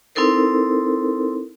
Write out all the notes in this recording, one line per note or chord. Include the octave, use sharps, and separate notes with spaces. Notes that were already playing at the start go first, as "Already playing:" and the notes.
C4 D#4 E4 A4 A#4 C5